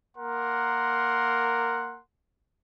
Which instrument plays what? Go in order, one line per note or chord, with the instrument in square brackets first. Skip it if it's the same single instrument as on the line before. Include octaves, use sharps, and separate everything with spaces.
[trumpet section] A#3 A#4 F#5 C6